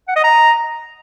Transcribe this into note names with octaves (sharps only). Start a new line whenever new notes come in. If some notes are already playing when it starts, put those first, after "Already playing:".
F#5
D#5
A#5